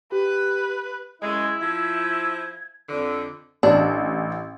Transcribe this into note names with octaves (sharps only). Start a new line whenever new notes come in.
G4 B4
F#2 G#3 E4 G#6
F3 E5
F2 D3
A1 D4